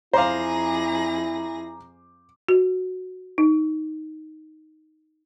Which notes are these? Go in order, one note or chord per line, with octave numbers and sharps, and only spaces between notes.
F2 E4 G#4 C5 F5 A#5 D6 A#6
F#4
D#4